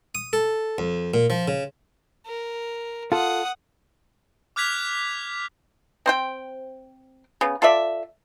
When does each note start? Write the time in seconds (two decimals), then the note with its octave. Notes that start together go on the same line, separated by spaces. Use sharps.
0.15 D#6
0.33 A4
0.78 F2
1.14 A#2
1.30 F3
1.48 C#3
2.26 A#4
3.12 F4 A4 F#5 D#6
4.56 D6 F6 F#6 G#6 B6 F7
6.06 C4 C5 G5
7.41 C#3 B3
7.62 F4 A4 D5 E5